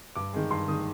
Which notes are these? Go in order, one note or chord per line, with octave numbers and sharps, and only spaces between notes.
G2 D6
D#3 G#3
G2 C6
D#3 G#3 D#6